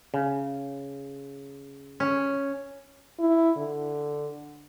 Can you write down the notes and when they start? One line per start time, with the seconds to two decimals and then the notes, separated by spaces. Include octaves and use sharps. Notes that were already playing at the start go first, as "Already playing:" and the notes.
0.14 C#3
2.00 C#4
3.19 E4
3.57 D3